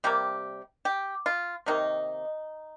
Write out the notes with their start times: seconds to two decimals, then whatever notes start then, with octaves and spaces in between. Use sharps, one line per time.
0.04 C3 G3 A#3 G4
0.85 G4
1.26 F4
1.66 C3 D#3 A#3 D#4